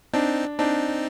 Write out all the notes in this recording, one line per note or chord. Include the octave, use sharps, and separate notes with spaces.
C4 D4 D#4
C4 D4 D#4